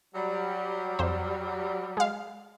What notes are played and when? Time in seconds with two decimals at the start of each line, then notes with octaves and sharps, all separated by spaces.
0.15 F#3 G3
0.99 F2 C5
1.97 G#3 F5